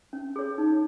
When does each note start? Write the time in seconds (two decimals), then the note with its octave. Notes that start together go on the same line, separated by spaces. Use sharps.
0.13 C#4
0.36 G#4 C#5
0.58 D#4